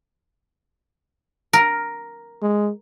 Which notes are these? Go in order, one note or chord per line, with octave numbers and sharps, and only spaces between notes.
A#4
G#3